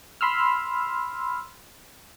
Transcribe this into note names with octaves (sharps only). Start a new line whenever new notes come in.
B5 C6 E6 F6